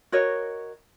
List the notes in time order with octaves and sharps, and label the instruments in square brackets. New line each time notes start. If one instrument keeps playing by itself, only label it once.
[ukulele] F#4 A#4 C#5 D#5